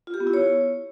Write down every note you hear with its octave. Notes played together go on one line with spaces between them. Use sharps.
F4
G4
B3
E4
C#5